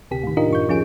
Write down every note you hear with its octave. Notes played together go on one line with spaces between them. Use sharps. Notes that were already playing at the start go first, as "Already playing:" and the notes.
D2 C3 G4 B6
A2 D#3
D4 D#4 F4 G4 A#4 D#5
F#2 C#6 G6
D2 F3 C#4 F4 G#4 D7